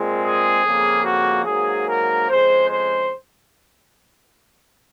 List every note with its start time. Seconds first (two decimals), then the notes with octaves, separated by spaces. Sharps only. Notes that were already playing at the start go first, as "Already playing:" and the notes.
Already playing: A#2 G#3 C4
0.22 G#4
0.64 F2 C#3 F3 A#3
1.05 F#4
1.46 G#2 F#3 A#3 G#4
1.88 A#4
2.28 F2 C#3 G#3 C5
2.70 C5